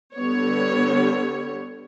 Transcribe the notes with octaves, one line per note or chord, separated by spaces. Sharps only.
D3 G3 B3 C#5